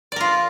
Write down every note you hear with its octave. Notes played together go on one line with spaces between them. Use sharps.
F4 A#4 D5